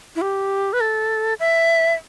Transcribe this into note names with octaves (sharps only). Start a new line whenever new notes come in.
E4
G4
B4
A4
E5